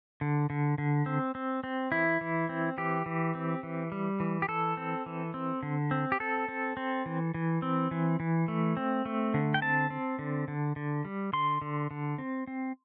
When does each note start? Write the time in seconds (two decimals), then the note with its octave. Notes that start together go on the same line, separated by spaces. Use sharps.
0.21 D3
0.50 D3
0.78 D3
1.06 C4
1.35 C4
1.64 C4
1.92 E3 E4
2.21 E3
2.49 C4
2.78 E3 G4
3.06 E3
3.35 C4
3.63 E3
3.92 G3
4.20 E3
4.42 G4
4.48 E3 A4
4.77 C4
5.06 E3
5.34 C4
5.63 D3
5.91 C4
6.12 G4
6.20 C4 A4
6.48 C4
6.77 C4
7.06 E3
7.34 E3
7.62 C4
7.91 E3
8.20 E3
8.48 A3
8.77 C4
9.05 A3
9.34 D3
9.54 G5
9.62 C4 A5
9.90 C4
10.19 D3
10.48 D3
10.76 D3
11.05 G3
11.33 D3 C6
11.62 D3
11.91 D3
12.18 C4
12.47 C4